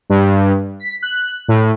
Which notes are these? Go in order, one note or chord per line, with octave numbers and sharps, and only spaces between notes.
G2
B6
F#6
A2